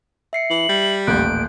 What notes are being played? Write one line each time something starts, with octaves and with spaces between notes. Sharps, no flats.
E5 C7 C#7
E3 F#7
G3
D#1 A1 F#6 G6 D7